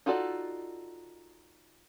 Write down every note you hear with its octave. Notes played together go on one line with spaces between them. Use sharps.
D#4 F4 F#4 A4 D5